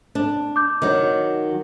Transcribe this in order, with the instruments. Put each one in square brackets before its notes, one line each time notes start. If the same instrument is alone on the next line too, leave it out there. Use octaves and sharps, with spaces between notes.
[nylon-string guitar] D4
[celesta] D6 G6
[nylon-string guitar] D#3 F#3